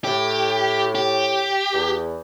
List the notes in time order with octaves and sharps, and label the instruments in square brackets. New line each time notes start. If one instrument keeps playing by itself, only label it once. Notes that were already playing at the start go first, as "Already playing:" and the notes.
[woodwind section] A2 [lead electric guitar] G4
[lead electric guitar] G4
[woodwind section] E2